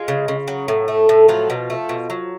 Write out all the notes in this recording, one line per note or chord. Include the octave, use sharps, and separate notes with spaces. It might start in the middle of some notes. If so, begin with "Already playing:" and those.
Already playing: G#3 F4
C#3
C#3
F#3
A2
A3
A2
F3 F#3 F4
B2
A3
B2
F#3